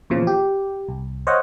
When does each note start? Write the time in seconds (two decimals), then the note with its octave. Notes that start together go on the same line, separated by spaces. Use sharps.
0.10 E2 A#2 C#3 F3
0.27 G4
0.88 C2
1.27 C5 C#5 D#5 F5 F#5